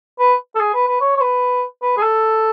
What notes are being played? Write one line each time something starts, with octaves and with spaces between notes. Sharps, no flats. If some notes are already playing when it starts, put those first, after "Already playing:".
B4
A4
G#4
B4
B4
C#5
C#5
B4
B4
G#4
A4